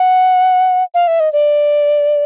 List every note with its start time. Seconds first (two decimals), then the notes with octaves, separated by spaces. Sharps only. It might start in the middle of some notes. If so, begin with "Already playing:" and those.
Already playing: F#5
0.94 F5
1.08 E5
1.20 D#5
1.33 D5